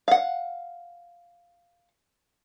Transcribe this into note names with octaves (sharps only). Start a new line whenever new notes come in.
F5 F#5